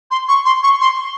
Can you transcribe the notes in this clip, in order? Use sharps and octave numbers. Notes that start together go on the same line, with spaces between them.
C6
C#6
C6
C#6
C6